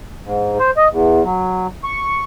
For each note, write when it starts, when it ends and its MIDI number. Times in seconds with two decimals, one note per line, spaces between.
0.25 0.58 44
0.60 0.70 72
0.77 0.88 75
0.91 1.23 40
1.24 1.67 54
1.84 2.24 85